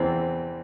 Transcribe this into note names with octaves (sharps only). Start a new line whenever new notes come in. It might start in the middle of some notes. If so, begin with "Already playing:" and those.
Already playing: E2 E3 C4